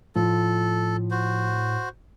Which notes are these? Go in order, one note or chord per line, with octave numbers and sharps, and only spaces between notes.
A2 F3 A4
F#4 C5